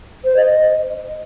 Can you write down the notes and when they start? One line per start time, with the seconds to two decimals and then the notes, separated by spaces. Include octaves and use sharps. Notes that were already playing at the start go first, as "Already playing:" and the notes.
0.24 C5
0.36 D#5